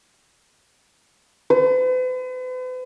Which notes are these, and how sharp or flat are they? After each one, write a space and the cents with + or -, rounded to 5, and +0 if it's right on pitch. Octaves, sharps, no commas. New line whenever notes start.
B4 +45